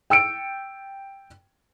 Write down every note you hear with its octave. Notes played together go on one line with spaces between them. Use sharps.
G5 E6 C#7 D7